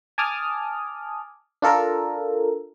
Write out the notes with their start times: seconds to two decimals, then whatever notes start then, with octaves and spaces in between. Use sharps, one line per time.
0.18 G#5 A5 D6 D#6 F6
1.62 D4 F4 A4 A#4